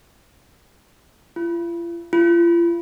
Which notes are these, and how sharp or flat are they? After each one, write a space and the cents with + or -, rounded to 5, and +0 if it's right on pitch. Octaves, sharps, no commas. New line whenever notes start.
F4 -45
F4 -40